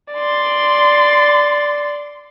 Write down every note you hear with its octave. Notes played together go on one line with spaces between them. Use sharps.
D5 C6